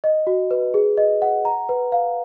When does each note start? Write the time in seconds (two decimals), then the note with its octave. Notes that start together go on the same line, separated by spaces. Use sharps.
0.04 D#5
0.27 F#4
0.51 B4
0.74 G#4
0.97 D#5
1.22 F#5
1.45 A#5
1.69 B4
1.92 F5